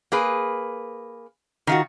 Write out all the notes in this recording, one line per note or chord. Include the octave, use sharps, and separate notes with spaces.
A#3 G#4 B4
D#3 F4 F#4